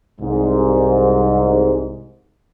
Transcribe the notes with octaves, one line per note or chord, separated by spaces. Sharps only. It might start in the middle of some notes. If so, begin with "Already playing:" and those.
C2 G#2